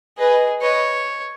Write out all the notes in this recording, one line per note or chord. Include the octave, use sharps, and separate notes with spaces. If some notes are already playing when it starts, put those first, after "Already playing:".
G#4 B4 D#5
B4 C#5 D#5